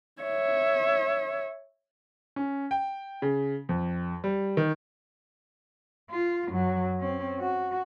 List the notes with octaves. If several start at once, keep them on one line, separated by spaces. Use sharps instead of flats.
C#5 E5
C#4
G5
C#3
F2
G3
D#3
F4
F#2 F#3
C4 C#4
F#4